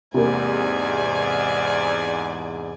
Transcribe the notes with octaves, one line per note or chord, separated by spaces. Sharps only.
E2 G#2 C3 A#3 D5 G#5